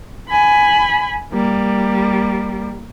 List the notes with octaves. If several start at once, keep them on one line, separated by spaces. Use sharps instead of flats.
G#5 B5
G3 A#3